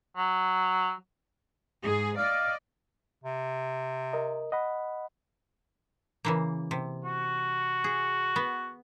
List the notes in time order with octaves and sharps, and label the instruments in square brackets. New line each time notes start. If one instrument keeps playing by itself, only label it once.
[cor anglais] F#3
[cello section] G#2 G#4
[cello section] D5 D#5 [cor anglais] F5
[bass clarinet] C3
[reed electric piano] A#4 D#5
D#5 F#5 B5
[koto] C#3 E3 A#3
C3
[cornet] F#4
[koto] G#4
B3